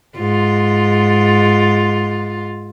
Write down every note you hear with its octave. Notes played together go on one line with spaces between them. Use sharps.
G#2 F4